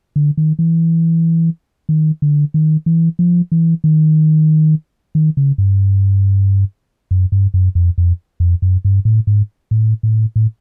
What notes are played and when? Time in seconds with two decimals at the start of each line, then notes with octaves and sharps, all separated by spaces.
0.16 D3
0.37 D#3
0.59 E3
1.89 D#3
2.22 D3
2.54 D#3
2.86 E3
3.19 F3
3.52 E3
3.84 D#3
5.15 D#3
5.37 C#3
5.58 G2
7.11 F#2
7.32 G2
7.54 F#2
7.75 F2
7.98 F2
8.40 F2
8.62 F#2
8.85 G2
9.05 A2
9.27 G#2
9.71 A2
10.03 A2
10.36 A2